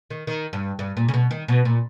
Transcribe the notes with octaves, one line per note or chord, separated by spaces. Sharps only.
D#3
D#3
G2
G2
A#2
C#3
B2
D#3
B2
A#2